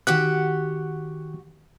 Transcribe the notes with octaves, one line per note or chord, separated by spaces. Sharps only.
D#3 F#4 G4 F#5 F#6